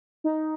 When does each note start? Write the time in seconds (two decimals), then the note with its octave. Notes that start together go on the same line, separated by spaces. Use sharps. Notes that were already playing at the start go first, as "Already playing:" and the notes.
0.24 D#4